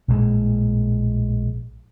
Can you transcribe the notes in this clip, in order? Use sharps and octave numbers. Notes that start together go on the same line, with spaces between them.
A#1 A2 C#3 G#3